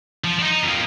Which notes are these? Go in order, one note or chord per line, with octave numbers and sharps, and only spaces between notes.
F3
D4 D#4
F2 A#3